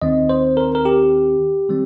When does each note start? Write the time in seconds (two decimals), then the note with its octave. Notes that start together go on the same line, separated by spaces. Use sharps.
0.02 D#2 D#3 C4 D#5
0.29 C5
0.57 A#4
0.75 A#4
0.85 G4
1.69 D#3 G3 C4